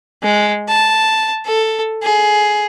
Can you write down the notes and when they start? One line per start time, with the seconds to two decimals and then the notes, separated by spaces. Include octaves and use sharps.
0.23 G#3
0.68 A5
1.46 A4
2.03 G#4